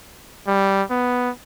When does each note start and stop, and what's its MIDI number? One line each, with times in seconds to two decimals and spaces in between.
0.47 0.83 55
0.90 1.30 59